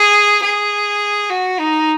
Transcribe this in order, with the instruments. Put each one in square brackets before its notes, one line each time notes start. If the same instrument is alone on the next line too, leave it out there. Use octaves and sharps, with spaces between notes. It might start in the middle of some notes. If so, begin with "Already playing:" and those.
Already playing: [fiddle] G#4
G#4
F#4
D#4